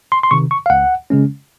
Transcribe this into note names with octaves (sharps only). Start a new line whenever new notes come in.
C6
C6
C3 D#3 C#6
C#6
F5
C#2 F#5
C#3 G#3 C#4